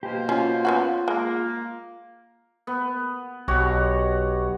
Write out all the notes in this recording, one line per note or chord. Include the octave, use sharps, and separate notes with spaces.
B2 A#3 G4 C5
C#4 F4
B3 C#4 F#4
G#3 A#3
B3
B1 F#4 G4 C#5